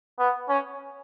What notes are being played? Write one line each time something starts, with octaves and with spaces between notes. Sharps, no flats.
B3
C#4